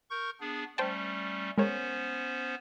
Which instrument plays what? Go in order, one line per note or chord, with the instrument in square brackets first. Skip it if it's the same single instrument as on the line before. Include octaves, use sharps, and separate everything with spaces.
[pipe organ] A#4 C#6 G6
B3 D4 G#4
[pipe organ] G3 A3 C#4 [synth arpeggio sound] C5 G5 A5
[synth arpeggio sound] G#3 A#4 C#5 [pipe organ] B3 C#4 C5